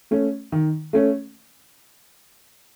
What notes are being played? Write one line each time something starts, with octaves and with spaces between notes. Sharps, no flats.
A3 C#4
D#3
A3 C#4